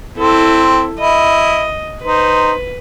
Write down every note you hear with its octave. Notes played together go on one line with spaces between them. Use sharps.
C4 E4 A4
E4 D#5
D#4 B4 C5